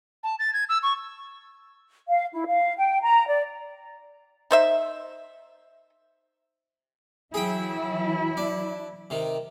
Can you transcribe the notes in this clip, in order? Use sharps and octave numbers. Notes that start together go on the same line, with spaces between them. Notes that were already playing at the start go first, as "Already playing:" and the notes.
A5
A6
G#6
E6
C#6
F5
E4
F5
G5
A#5
D5
D#4 C5 E5
E3 F#3 E4 G#4 G5
D4
C3 D#3